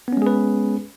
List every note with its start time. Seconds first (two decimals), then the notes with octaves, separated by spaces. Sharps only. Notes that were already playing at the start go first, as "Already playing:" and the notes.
0.08 B3
0.13 C#4
0.17 G#3
0.22 G#4
0.27 B4